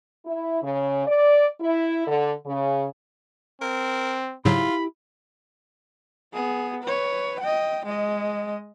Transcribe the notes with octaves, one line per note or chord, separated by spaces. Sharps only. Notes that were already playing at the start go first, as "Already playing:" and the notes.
E4
C#3
D5
E4
D3
C#3
C4 A#4
G#2 C#3 F#3 E4 F4 G4 B5
B3 G#4
B4 C#5
D#5 G5
G#3 D#5